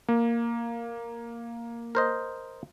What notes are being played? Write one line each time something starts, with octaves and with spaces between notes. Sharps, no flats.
A#3
A#4 C5 D#5